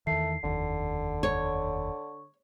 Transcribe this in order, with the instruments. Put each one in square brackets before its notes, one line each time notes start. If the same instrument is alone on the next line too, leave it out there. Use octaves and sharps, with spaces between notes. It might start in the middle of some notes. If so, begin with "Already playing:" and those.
[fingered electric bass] E2 D#3 [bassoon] A3 [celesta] C7
[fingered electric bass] F1 D#2 [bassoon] D3
[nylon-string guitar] C#5 [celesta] C#6